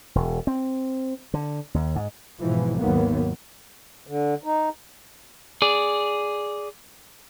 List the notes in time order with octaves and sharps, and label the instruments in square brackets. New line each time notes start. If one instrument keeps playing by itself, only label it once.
[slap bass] E1
C4
D3
D#2
G#2
[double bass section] G#2 B2 E3 F3
G#1 D#2 D#3 F#3 A#3 B3
[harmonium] D3
D#4
[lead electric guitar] G#4 D5